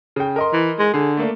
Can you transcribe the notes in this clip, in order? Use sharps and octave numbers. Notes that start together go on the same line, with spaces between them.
C#3 G5
A#4 D#5 C6
E3
G#3
D3 G#4
A3 A#3 D4